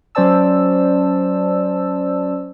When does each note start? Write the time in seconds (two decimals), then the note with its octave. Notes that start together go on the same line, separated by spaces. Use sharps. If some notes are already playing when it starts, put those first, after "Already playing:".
0.15 F#3 C#4 C5 D5 A5 E6